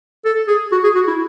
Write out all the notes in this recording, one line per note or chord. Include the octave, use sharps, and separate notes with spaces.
A4
G#4
F#4
G#4
F#4
E4